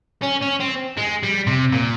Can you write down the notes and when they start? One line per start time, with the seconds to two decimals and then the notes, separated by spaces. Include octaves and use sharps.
0.23 C#4
0.42 C#4
0.60 C4
0.97 G#3
1.23 G3
1.47 C3
1.72 A#2